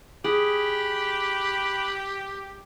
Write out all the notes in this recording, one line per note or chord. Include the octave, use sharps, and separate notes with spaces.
G4 G#4 B5 D6 F#6